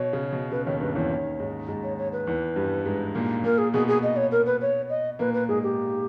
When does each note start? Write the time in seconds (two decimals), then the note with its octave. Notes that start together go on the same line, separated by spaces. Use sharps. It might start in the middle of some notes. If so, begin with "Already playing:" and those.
Already playing: B2 C#5
0.13 C#3
0.32 B2
0.52 C#3 B4
0.66 D#2 D#3 C#5
0.81 G2 G3 B4
0.96 E2 E3 C#5
1.10 D#2 D#3
1.39 G#2 G#3
1.68 G#2 G#3
1.83 C#5
1.98 C#5
2.12 B4
2.27 E2 E3
2.56 G2 G3
2.86 G#2 G#3
3.15 A#2 A#3
3.44 A#2 A#3 A#4
3.58 G#4
3.73 B2 B3 G#4
3.88 G#4
4.03 D#5
4.17 C#5
4.32 A#4
4.46 B4
4.61 C#5
4.90 D#5
5.19 A#2 A#3 B4
5.34 B4
5.49 G#2 G#3 G#4
5.63 G4